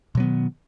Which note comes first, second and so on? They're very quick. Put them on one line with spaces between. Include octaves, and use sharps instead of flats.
B2 F#3 B3 D#3